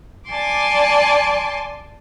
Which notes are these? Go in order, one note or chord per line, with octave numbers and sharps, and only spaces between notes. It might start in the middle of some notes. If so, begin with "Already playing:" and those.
D5 G#5 A5 C6 D6